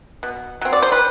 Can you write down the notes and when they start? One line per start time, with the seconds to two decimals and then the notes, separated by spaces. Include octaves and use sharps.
0.23 B2
0.61 F#3 C4
0.73 D5
0.83 C5
0.92 B4